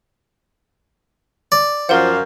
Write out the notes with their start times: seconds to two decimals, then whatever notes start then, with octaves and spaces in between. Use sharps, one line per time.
1.52 D5
1.89 F#2 F3 A#4 C5 F5 F#5